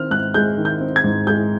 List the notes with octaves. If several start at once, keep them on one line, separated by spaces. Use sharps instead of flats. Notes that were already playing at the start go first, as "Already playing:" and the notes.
Already playing: D#3 C4 F6
G#2 F#6
G#3 G6
D#3
G6
C4
G#6
G#2
G#3 G6